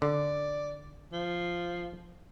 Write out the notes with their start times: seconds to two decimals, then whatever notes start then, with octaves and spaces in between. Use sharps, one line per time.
0.02 D3 D5
1.12 F3